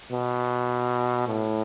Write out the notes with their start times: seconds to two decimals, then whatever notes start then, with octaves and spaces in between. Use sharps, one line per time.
0.12 B2
1.28 A2